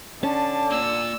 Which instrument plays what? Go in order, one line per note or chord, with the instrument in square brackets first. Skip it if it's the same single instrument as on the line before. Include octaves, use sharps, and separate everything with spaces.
[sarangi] D3 [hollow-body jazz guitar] C#4 [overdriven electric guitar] A5
[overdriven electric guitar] A#3 F4 [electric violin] E6